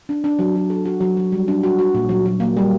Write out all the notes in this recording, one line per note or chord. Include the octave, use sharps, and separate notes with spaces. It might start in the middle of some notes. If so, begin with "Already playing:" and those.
D4
D4
F#3
F#3
A4
F#4
F#3
F#3
G3
D4
F#4
F#4
A#2
F#3
F#3
A#3
G3